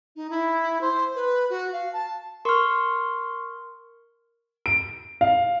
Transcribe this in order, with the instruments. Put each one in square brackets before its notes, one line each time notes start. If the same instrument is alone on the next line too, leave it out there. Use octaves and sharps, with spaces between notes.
[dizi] D#4
E4
C5
B4
F#4
F5
A5
[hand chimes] A#4 F6 [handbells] C6 C#6
[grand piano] D7
F5